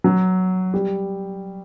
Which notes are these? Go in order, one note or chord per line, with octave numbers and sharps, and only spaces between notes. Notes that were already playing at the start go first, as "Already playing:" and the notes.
F#3
G3